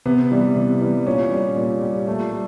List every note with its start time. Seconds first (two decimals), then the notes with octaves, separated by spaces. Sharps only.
0.05 C3 B3
0.31 E3 G3
0.56 C3
0.81 E3 G3
1.06 A#2 C#4
1.31 G3
1.56 A#2
1.82 G3
2.07 A#2 A3
2.32 G3